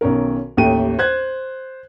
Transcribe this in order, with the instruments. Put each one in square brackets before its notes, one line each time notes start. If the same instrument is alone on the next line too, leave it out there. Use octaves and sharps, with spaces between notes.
[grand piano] B1 D#3 C#4 A#4
A1 D#2 A3 G4 D#7
C5 F#6 G#6